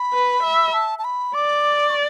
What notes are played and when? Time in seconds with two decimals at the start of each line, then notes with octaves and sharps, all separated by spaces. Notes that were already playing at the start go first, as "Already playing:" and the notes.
Already playing: B5
0.13 B4
0.43 E5
0.73 A5
0.99 A5
1.04 B5
1.34 D5 D6
1.90 C#6